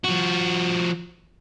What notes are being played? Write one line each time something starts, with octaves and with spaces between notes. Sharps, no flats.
F3 F#4